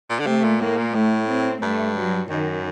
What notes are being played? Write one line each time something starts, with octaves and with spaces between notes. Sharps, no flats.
A#2
D3
C3 A3
A#2
A2 A#3
A#2
A2 A3
C4
G2 A3
F#3
F#2 D#3